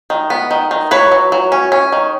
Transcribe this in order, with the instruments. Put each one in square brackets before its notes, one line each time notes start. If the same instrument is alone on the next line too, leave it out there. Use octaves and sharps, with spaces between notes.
[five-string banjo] D#3
B3
D#3
D#3
F#3 B4 C#5
F#3
F#3
C#4
C#4
D#3